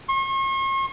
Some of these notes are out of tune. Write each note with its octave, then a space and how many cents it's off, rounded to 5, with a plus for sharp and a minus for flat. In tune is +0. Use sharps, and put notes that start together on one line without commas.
C#6 -45